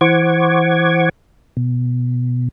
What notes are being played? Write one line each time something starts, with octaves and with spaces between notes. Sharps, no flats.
E3 C5 F#5 C#6 D6 G#6
B2